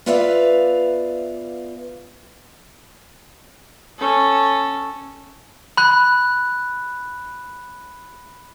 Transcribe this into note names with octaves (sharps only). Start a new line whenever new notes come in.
B3 F4 B4 D5 E5 F5
C#4 A4
B5 F#6